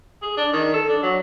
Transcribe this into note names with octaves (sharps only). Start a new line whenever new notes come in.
G#4
D4
D#3
A4
D4
F#3